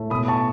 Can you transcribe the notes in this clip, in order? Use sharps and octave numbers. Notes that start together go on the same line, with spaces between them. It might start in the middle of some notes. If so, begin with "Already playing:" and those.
Already playing: A2 A3
B2 B5 D#6
A5 C#6